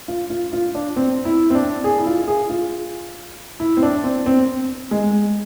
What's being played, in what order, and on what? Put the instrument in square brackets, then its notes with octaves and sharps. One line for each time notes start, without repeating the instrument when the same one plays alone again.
[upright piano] F4
F4
F4
D4
C4
E4
C4
D4
G#4
E4
F4
G#4
F4
E4
C4
D4
C4
C4
G#3